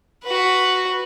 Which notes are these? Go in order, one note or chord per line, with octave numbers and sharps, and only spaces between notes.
F#4 B4